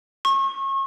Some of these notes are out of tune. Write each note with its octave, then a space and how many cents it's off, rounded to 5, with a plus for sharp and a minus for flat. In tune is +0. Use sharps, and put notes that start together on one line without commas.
C#6 -35